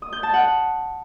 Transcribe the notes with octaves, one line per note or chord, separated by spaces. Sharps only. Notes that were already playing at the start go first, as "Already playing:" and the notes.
D#6
G6
A5
F#5